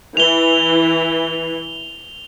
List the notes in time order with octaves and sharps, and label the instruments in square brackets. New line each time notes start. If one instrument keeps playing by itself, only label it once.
[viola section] E3 [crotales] F7 G7